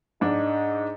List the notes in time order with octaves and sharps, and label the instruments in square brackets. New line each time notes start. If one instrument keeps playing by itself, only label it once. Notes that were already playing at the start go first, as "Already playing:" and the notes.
[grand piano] G#2 D4 [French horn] D#4